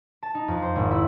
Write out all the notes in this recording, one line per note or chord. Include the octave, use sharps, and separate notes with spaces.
A5
D#4
F2
C5
G#1
E4